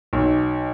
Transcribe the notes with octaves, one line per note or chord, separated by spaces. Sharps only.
B1